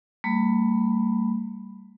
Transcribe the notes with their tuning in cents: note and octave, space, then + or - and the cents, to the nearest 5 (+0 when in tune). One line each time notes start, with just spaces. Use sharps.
G3 +0 A#3 -40 B5 +0